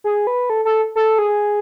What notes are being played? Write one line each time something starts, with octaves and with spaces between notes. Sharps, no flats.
G#4
B4
A4
A4
A4
G#4